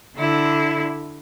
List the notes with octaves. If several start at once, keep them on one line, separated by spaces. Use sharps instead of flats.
D3 E4